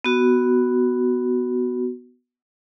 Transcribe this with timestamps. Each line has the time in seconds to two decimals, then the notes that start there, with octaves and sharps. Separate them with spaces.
0.04 B3 F#4